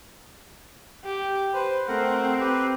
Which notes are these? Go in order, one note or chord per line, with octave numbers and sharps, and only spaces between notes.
G4
B4 C5
A3 C4 A#4 F#5
G4 B4